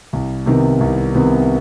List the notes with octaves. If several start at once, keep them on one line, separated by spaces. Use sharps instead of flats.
C2
C3 D#3 B3
C2
C3 D#3 B3